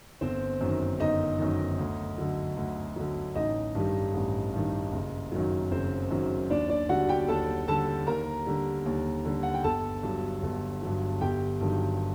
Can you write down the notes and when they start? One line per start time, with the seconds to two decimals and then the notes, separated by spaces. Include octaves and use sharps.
0.21 G1 C4 C5
0.61 F#2 D#3
1.00 G1 D#4 D#5
1.39 F#2 D#3
1.79 D2
2.18 D3 F#3
2.57 D2
2.96 D3 F#3
3.36 A1 D#4 D#5
3.75 G2 D#3 G3
4.14 A1
4.53 G2 D#3 G3
4.93 F#1
5.32 F#2 D#3 F#3
5.71 F#1 C4 C5
6.11 F#2 D#3 F#3
6.50 D#2 D4 D5
6.69 D4 D5
6.89 D3 G3 F#4 F#5
7.09 G4 G5
7.28 D#2 A4 A5
7.68 D3 G3 A4 A5
8.07 D#2 A#4 A#5
8.46 D3 G3
8.86 D#2
9.25 D3 G3
9.43 F#5
9.54 G5
9.64 G1 A4 A5
10.03 G2 F#3
10.43 G1
10.82 G2 F#3
11.21 G1 G4 G5
11.61 G2 D#3 F#3